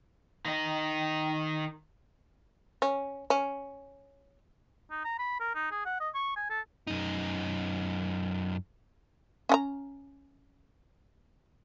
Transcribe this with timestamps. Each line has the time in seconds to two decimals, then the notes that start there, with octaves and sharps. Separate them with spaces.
0.45 D#3 D#4
2.82 C#4
3.30 C#4
4.91 D#4
5.04 A#5
5.19 B5
5.40 A#4
5.55 D#4
5.71 G#4
5.86 F#5
6.00 D#5
6.15 C#6
6.36 G#5
6.50 A4
6.87 F#2 D#4
9.49 C#4 F#5 A#5